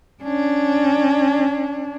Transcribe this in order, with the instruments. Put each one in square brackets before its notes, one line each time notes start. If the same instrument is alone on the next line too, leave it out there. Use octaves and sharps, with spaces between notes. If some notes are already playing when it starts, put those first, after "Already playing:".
[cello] C#4 D4